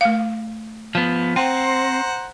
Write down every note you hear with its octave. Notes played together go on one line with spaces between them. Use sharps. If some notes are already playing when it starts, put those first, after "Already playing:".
A3 F5
F3 B3
C4 C5 F#5 G5 A#5